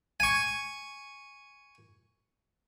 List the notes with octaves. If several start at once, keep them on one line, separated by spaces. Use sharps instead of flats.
G#5 C#6